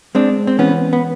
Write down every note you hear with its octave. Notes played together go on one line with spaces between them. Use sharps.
G#3 C4 D4
C4
E3 B3 C#4
B3